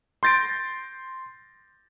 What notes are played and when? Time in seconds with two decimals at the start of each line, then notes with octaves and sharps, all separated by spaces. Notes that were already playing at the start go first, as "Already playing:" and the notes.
0.23 C6 G6 A6 A#6 D7